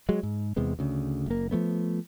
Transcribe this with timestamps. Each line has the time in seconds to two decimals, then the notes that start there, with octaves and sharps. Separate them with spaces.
0.09 F#3 G#3
0.23 G#2
0.56 E2 C3 G#3 B3
0.79 D2 C#3
1.26 F#1 A#3
1.51 F3 F#3 A3 B3